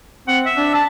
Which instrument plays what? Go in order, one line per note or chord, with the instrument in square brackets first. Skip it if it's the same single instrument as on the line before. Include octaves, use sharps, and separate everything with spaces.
[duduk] C4 [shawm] F#5
[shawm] E5
[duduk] D4
[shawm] A5